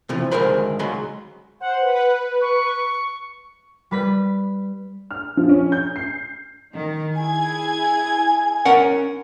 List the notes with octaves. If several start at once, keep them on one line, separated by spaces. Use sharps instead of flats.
C3 E3 F3
D2 D#3 G#3 A#4 C5 B5
C#2 F#3 G#3 B5 C6
C5 F#5
B4
C#6
G3 B4 B6
F6
F3
C#4
G6
C7
D#3
E4 G#4 G#5 G#6
G#5
C#4 A#4 F#5